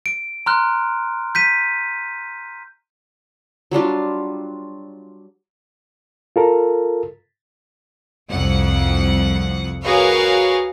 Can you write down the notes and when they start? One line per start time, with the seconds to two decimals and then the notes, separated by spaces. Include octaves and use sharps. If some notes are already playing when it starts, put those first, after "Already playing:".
0.06 D7
0.46 A#5 C6 F6 F#6
1.35 G6 B6 D#7
3.71 F#3 G3 D4 F4
6.36 F4 A4 A#4
8.31 C2 F2 F#5
9.83 F#4 G#4 A#4 B4 C#5 F5